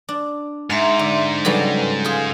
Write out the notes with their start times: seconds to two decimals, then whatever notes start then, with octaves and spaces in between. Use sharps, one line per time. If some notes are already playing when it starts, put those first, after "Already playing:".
0.09 D4
0.70 G#2 E5 A#5 C6
0.99 D3
1.45 C#3 F#3 G3 A4 B4
2.05 F4 G#4 A4 F5